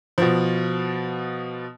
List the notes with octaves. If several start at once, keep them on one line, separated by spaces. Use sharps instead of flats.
B2 F3